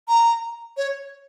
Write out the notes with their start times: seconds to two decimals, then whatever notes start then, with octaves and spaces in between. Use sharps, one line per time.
0.08 A#5
0.77 C#5